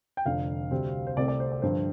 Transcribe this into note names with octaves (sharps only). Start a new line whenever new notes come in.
G5
F1 F2 D3 F5
D2 C3 G3 C4
C5
C2 C3 A3 C4 D5
D5
C5
D5
G2 D3 F3 C5